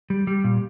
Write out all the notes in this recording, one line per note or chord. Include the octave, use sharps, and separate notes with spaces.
G3
G3
A#2